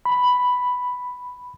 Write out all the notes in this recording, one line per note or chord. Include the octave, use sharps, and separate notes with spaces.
B5